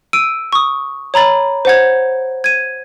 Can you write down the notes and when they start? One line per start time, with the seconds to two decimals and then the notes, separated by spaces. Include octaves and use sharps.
0.13 E6 D7 D#7
0.53 C#6 D#6
1.14 C#5 A#5 B5 A6
1.65 C5 F#5 G#6
2.44 G#6 D#7